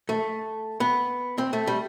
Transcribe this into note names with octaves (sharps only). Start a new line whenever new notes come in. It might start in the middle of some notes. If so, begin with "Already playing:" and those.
A3
B3
C4
A3
G3